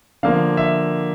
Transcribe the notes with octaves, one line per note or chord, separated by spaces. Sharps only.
D3 F3 A#3 F5
E5